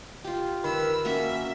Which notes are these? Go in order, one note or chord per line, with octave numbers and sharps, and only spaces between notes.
F4 G4
D#3 A#4 B4 B5 E6
A#3 C#4 F#4 A#4 E5